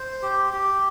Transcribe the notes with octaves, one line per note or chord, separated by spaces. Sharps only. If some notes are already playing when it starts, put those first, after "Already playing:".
Already playing: C5
G4
G4